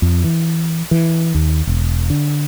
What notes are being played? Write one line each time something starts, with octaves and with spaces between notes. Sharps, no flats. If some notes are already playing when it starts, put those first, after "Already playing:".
F2
E3
E3
D#2
E1
D3